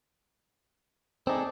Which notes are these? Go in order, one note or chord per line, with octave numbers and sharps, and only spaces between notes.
C4 D#4 G#4 A4 D5